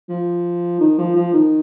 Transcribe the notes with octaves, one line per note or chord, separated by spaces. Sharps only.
F3
D#3
F3
F3
D#3